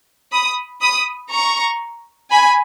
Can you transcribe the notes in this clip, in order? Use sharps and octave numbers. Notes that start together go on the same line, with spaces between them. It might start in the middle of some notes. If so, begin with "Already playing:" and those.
B5 D#6
B5 D#6
A#5 C#6
G#5 B5